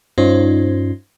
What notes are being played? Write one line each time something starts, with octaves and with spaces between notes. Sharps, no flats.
G2 C#4 D#4 F4 C5